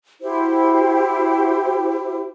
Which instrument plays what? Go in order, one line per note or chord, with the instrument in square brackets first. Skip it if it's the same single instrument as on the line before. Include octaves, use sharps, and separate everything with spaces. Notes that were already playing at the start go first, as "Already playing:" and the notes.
[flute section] E4 F#4 G4 C5